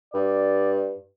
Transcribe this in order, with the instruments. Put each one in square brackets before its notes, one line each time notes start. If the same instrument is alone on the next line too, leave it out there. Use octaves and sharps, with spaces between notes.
[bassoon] G2 [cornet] D5